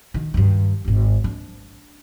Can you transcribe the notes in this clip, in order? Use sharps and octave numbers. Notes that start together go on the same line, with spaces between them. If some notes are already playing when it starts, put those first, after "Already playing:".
D#3
G2 D#3
D#1 G#1
D4